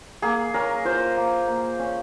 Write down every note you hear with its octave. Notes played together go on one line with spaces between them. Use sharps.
A#3 G#4
C#4 A#4
F4 C5
A#3
A#3
C#4